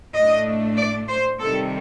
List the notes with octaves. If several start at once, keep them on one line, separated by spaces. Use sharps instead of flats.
A2 A3 D4 D#5
D5
C5
C3 D#3 G3 A4